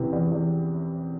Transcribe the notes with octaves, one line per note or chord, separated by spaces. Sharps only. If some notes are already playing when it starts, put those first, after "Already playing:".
Already playing: E2 C3 E3
E2
E2